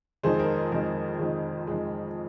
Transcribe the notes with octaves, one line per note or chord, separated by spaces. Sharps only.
F2 D#3 G#3 G#4 C5
A#4
F2 D#3 G#3 A#4
F2 D#3 G#3
F2 D#3 G#3